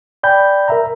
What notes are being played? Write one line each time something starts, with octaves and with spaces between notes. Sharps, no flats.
D5 G5 G#5 B5 G6
A#4 E5 A#5